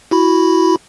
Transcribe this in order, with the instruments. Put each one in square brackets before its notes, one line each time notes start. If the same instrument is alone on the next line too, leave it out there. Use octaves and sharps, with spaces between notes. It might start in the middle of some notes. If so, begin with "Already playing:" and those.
[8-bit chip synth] E4 F#4 B5